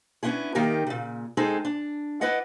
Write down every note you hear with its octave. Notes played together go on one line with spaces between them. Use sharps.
B3 C#4 D4 E4 G#4
D#3 A#3 D#4 G4 A#4
A#2 C#3
G#3 C4 D#4 G#4 A4 C5
D4
E4 B4 D5 D#5 F#5